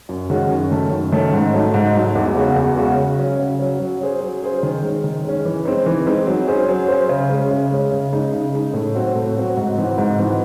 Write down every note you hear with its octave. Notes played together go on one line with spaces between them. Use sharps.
F#2
D#3 G#3 C#4 F#4
F#2
D#3 A3 C#4
F#2
D#3 A3 C#4
G#2
F#3 A3 D#4
G#2
F#3 A3 D#4
E2
C#3 G#3 C#4 F#4
E2
C#3 G#3 C#4 F#4
C#3
F#3 C#4
C#3
F#3 C#4
F#3
C#4 G#4 C5
F#3
C#4 G#4 C5
D#3
G#3 C#4
D#3
G#3 C#4
E3
G#3 C4 D#4
E3
G#3 C4 D#4
F#3
C#4 G#4 C5
F#3
C#4 G#4 C5
C#3
G#3 C#4
C#3
G#3 C#4
C#3
G#3 D#4
C#3
G#3 D#4
A2
F#3 C4 F#4
A2
F#3 C4 F#4
G#2
E3 C4 D#4 F#4
G#2
E3 C4 D#4 F#4